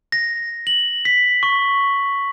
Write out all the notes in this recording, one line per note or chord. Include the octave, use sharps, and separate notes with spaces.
A#6
F#7
B6
C#6